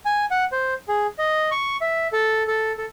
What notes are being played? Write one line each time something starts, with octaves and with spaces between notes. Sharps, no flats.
G#5
F#5
C5
G#4
D#5
C#6
E5
A4
A4
A4